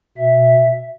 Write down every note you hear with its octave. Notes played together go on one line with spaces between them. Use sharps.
B2 E5